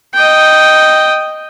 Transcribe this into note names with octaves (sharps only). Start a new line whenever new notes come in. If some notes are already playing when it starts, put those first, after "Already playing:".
D#5 G5